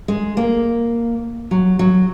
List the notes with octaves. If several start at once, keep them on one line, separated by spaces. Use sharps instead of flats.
G#3
A#3
F#3
F#3